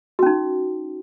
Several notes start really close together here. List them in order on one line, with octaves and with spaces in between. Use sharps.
F#4 C#4 D#4